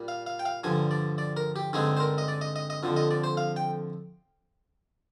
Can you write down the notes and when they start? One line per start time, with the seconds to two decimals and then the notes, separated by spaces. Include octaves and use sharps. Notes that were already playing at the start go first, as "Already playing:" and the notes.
Already playing: A#2 G3
0.08 F5
0.27 F5
0.39 G5
0.45 F5
0.64 G2 D3 F3 G#5
0.91 D5
1.18 D5
1.37 A#4
1.56 G4
1.73 G2 D3 G#3 C4 D#4 G#4
1.97 C5
2.00 A#4
2.18 D#5
2.28 D5
2.41 D#5
2.56 D#5
2.70 D#5
2.83 F2 D3 F3
2.96 D#5
3.11 D5
3.24 C5
3.37 F5
3.56 G5